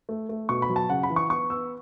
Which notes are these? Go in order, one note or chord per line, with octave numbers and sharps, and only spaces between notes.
A3
A3
B2 C#6
B5
F#3
A5
C#3 F#5
B5
E3
C#6
B3 C#6
B3 E6